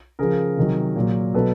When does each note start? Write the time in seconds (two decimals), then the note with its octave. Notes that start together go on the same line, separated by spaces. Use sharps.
0.19 C#3 F3 G#4 A#4
0.57 C3 D#3 F#3
0.96 A#2 F#3
1.34 B2 F#3 A4 B4